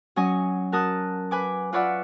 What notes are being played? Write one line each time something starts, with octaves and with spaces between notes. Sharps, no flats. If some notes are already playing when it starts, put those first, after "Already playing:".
F#3 C#4 D#5 G#5
F#4 A#4 A5 D#6 F#6
B4 G#5 D6
F4 B4 C#5 D5 E5 F#5